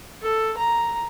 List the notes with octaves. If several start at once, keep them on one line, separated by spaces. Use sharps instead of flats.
A4
A#5